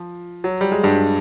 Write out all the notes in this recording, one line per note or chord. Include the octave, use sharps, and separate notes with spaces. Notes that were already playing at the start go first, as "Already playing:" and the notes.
Already playing: F3
F#3
G3
G#3
G2 G3